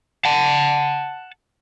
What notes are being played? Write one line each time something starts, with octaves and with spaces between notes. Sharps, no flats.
F#5 A5